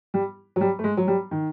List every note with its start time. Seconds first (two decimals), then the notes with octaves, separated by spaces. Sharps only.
0.14 G3
0.56 F#3
0.61 G3
0.79 A3
0.84 G#3
0.97 F#3
1.07 G3
1.31 D#3